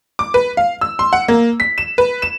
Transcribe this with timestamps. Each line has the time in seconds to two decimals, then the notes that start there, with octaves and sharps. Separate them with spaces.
0.19 D6
0.34 B4
0.57 F5
0.81 E6
0.99 C6
1.13 F#5
1.28 A#3
1.60 B6
1.78 E7
1.98 B4
2.22 E7